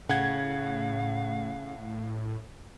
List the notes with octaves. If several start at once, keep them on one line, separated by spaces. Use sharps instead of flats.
A2 C#3 F5 F#5 G#6